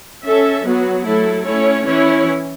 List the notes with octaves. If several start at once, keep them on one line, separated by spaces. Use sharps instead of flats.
C#4 A4 E5
F#3 B3 F#4
F#3 A3 E4 A4
A3 C#4 E4 C#5
E3 C#4 E4 C#5